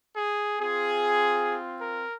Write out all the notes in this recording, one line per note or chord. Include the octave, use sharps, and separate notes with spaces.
G#4
C4 F4 G#4
A#4